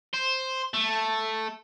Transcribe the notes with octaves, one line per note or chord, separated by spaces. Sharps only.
C5
A3